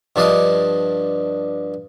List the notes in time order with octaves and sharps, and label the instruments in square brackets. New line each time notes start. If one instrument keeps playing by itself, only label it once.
[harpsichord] G2 F3 D4 D5 D#5 F5